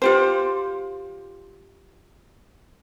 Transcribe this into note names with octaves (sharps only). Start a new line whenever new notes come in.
F4 G4 C5